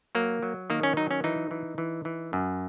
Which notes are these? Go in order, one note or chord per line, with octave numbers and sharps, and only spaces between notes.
F#3 A#3
F#3
D#3 A#3
C#4
F#3 D#4
C#4
E3 D#4
E3
E3
E3
F#2